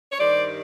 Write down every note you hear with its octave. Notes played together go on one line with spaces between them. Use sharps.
C#5
G2 D#3 G3 C5 D5